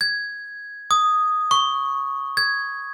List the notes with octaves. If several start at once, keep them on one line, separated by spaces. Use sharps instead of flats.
G#6
D#6
C#6
G#6